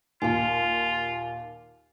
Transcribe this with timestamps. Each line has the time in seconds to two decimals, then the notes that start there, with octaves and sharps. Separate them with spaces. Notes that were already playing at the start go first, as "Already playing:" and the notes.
0.22 D#2 A#2 F4 F5 G#5